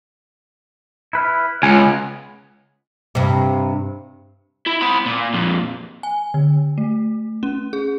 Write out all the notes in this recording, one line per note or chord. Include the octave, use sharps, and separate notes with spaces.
E4 B4 F6
C#2 B3 G#5
G2 C3
E4
C4 B5
A#2
F2 A#2
G#5
D3
A3
C#4
G#4